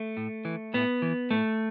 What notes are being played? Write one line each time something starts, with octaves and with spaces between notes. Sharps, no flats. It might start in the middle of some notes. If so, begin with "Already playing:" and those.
Already playing: A3
A2
E3
A2 B3
E3
A2 A3